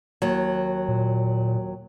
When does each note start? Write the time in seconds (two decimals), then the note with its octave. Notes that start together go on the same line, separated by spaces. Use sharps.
0.22 D#2 F#3
0.89 A#2